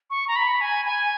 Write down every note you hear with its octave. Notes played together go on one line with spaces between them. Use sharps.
C#6
A#5
B5
G#5
G#5